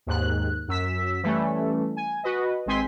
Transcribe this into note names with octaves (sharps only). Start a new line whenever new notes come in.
D#2 G#2 F#6
F#2 E6 B6
E3 G3 A3 C#4
G#5
F#4 B4 D#5
G#1 G#3 C4 G#5 C6 B6